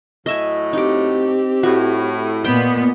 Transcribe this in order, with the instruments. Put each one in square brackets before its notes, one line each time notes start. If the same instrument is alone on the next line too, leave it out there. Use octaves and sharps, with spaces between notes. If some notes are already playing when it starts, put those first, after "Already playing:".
[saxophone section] A2 F#3 A3 [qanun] D#5 E5 G#5
[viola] C4 G4 [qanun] D#4 D6
[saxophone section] A2 [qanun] F#4
[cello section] A#2 B3 [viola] D#5 [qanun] G5